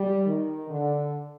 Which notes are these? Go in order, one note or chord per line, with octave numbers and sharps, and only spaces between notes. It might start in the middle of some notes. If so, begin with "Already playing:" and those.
Already playing: G3
D#3
D3